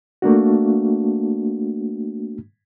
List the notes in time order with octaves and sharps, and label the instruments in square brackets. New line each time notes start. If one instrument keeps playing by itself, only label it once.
[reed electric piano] A3 A#3 D4 F#4